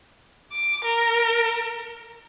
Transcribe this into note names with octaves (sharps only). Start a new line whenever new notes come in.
D6
A#4